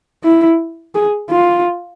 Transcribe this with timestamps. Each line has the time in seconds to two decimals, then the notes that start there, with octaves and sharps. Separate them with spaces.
0.24 E4
0.95 G#4
1.31 F4